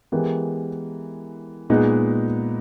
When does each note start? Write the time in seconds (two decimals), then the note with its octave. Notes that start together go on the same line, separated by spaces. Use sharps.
0.12 E3 G#3 B3 G4 A#4
1.70 A#2 G#3 B3 D#4 G#4